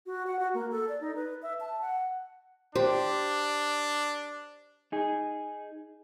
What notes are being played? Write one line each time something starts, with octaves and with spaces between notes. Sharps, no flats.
F#4
F#5
F#4
A#3
A4
D5
D#4
B4
E5
A5
F#5
D4 G4 C5
D#4 G#4